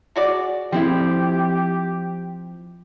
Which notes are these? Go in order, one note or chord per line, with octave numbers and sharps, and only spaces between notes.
G#3 F#4 D5
F3 C4 E4 G4